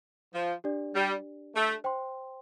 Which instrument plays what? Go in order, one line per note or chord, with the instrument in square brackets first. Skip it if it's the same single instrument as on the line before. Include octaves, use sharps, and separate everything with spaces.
[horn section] F3
[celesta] D4 G4 D5
[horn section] G3
A3
[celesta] C5 G5 C6